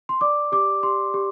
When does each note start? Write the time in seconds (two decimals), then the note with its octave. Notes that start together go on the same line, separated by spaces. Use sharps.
0.09 C6
0.21 D5 D6
0.52 G4 D6
0.83 G4 C6
1.14 G4